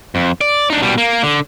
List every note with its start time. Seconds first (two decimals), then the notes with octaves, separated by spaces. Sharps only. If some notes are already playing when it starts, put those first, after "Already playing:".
0.15 F2
0.41 D5
0.70 D4 D#4
0.82 B2 G3
0.98 A#3
1.23 D3